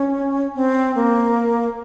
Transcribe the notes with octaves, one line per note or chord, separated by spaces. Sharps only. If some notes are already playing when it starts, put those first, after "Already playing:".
Already playing: C#4
C4
A#3